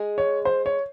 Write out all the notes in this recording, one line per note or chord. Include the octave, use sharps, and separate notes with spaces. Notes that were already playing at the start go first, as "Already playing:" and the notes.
Already playing: G#3 G#4
C#5
C5
C#5